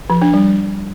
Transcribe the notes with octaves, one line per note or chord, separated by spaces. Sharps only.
F3
D4
G3